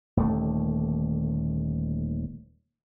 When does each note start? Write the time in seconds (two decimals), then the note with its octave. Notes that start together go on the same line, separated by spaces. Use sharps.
0.17 D#1 D#2 D3 A3